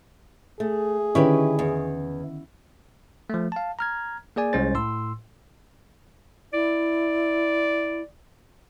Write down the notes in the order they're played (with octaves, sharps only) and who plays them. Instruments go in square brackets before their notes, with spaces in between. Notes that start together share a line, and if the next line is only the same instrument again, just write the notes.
[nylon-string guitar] A3 [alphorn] G#4
[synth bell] D3 D#3 C#4 [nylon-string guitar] E4 G4 B4
[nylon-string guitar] E2
[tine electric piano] F3 A3
F5 A5
A#5 F6 G#6
A#3 G#4 D5 G#5
C2 G#3 C#4 C5 A6
A2 C6 E6
[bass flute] E4 [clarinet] D5